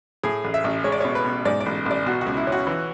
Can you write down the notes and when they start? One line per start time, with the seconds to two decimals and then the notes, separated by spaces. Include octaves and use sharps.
0.23 A2 G#4
0.44 A1
0.54 E5
0.64 A1
0.84 G#3 C#5
0.92 D5
1.00 B2 C#5
1.15 B4
1.25 B2
1.45 G#2 D5
1.60 D5
1.66 A1
1.86 A1 D5
2.06 B2 F#4
2.21 F#4
2.26 C#2
2.37 E4
2.47 C#4
2.52 F#4
2.67 E3